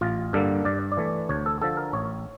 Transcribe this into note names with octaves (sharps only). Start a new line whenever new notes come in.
A1 F4
G2 D3 G3 A#3 A4
G2 D5
D5
E3 A3
D2 C#5
A4
D3 F3 A4
A#4
A1 C#5